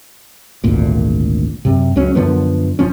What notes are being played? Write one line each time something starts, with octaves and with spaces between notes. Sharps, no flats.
G#1 D2 A#2
F#2 C3
C#2 F#3 C#4
F#2 D3 F3 B3
E1 F3 C#4